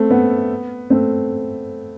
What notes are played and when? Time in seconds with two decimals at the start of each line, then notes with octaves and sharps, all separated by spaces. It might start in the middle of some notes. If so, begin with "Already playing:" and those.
Already playing: A3 C4
0.11 B3
0.90 A3 C4